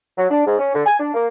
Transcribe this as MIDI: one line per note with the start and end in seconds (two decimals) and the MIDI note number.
0.17 0.26 54
0.30 0.46 62
0.47 0.57 44
0.59 0.70 61
0.75 0.82 50
0.86 0.95 80
1.00 1.11 62
1.14 1.27 58